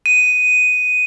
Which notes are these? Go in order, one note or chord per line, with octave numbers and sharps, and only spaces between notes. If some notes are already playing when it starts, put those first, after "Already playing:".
D#7